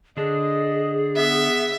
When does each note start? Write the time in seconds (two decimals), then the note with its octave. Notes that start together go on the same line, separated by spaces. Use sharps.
0.17 D3 D4 G#4 D#5
1.16 B3 E5